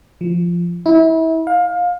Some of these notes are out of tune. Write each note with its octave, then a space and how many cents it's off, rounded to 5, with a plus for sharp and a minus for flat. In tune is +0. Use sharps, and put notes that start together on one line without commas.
F3 -10
E4 -30
F5 +25